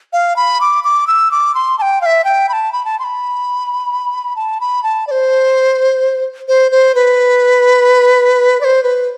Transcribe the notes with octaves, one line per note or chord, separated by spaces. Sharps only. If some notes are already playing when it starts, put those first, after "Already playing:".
F5
B5
D6
D6
E6
D6
C6
A5
G5
F5
E5
G5
B5
A5
B5
A5
C6
B5
A5
B5
A5
D5
C5
C5
C5
B4
D5
C5
B4